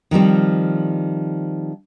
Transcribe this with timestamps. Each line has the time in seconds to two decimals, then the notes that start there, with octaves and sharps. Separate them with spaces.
0.11 D#3 F3 G3 C4